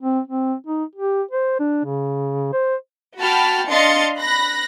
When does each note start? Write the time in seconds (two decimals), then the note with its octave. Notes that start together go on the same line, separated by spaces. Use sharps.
0.01 C4
0.28 C4
0.66 D#4
0.96 G4
1.31 C5
1.59 D4
1.85 C#3
2.53 C5
3.20 F#4 G5 A5 B5 F6
3.68 D4 D#5 F5 C6 A6 C#7
4.19 B5 F#6 A#6